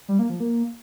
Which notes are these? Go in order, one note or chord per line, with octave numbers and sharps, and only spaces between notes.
G3
A#3
F3
A#3